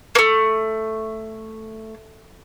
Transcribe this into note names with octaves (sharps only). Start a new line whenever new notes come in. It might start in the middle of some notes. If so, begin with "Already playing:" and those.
A3 A#3